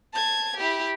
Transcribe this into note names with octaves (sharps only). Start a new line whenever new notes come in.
A5 G#6
E4 G4